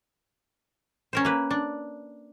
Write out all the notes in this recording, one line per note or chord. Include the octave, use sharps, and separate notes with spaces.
C#4 A#4 C5
A#3 B4
D4